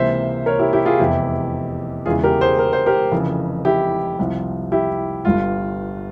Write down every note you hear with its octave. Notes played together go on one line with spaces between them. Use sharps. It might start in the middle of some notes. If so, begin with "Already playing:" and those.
Already playing: C#2 C3 E3 A#3 C5 E5
A#4 C#5
E4 G4
E4 G4
F4 G#4
F1 E2 C3 E4 G4
E1 E2 C#3 E3 G#3 F4 G#4
G4 A#4
G#4 C5
A#4
C5
G4 A#4
F1 F2 C#3 E3
E4 G4
C2 C3 F3
E4 G4
G1 G2 G3 F4